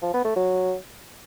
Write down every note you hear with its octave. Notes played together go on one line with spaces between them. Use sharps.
F3
B3
A3
F#3